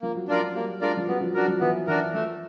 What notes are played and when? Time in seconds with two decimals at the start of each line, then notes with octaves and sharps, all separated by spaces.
0.02 F3 A#3
0.16 F#3
0.28 F3 D4 F4 A#4 D5
0.42 F#3
0.55 G3 A#3
0.81 G#3 D4 F4 A#4 D5
0.97 F3
1.08 F#3 B3
1.21 F3
1.34 F#3 D4 F#4 A#4
1.48 F3
1.60 E3 B3
1.87 E3 D4 F#4 A#4
2.14 F3 A3